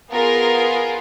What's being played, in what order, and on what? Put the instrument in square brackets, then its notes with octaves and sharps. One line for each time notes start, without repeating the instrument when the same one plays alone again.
[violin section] B3 F4 G#4 A#4